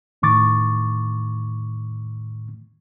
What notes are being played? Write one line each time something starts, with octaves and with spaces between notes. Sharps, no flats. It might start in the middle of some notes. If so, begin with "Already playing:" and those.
E2 A2 D#3 C#6 D6 A6